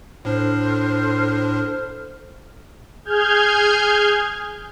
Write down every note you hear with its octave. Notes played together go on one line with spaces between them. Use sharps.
A2 D4 A4 C5 F6
G#4 F6 G6 G#6